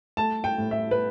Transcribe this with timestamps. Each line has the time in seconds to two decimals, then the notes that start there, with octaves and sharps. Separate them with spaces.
0.17 A3 A5
0.44 G5
0.58 A2
0.71 E5
0.91 B4